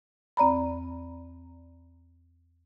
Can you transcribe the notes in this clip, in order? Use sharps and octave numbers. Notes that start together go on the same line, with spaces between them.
E2 C4 D5 A#5 B5